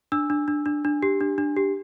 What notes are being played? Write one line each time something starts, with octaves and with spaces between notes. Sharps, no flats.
D4 E6
D4
D4
D4
D4
G4
D4
D4
G4